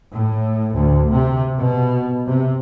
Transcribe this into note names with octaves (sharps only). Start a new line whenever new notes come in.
A2
D2
C3
B2
C3